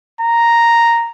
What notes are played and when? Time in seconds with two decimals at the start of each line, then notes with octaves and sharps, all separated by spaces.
0.21 A#5